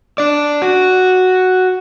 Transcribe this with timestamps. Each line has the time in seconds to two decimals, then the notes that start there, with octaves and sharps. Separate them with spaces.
0.18 D4 D5
0.62 F#4